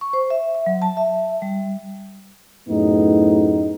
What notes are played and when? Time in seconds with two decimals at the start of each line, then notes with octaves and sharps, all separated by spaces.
0.01 C#6
0.13 C5
0.30 E5
0.55 E5
0.66 F#3
0.82 A5
0.97 E5
1.42 G3
2.69 F#2 A2 B3 D#4 G#4